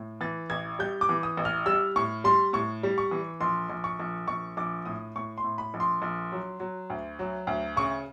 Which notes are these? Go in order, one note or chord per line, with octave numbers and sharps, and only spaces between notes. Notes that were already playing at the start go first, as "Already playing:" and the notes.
Already playing: A2
E3 A6
A1 G#6
G3 G6
D6
E3
D#6
A1
F6
G3 E6
A2 C#6
G3 C6
A2 C#6
G3
C#6
E3
A#1 C6
A#1
C#6
A#1
A#1 C#6
A#1 D6
A2 D#6
A2 C#6
C6
A2
B5
A#1
C6
A#1
F#3
F#3
D2
F#3
D2
C#3 C#6